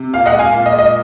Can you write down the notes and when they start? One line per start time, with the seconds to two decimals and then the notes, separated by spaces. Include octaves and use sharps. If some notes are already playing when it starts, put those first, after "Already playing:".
Already playing: C3
0.13 A#2 F5
0.26 D#5 F#5
0.33 G#3
0.39 F5 G#5
0.52 A#2 F5
0.66 D#5
0.73 G#3
0.79 D#5